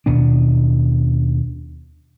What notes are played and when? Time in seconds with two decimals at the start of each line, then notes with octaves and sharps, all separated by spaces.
0.06 D#2 B2 B3 D4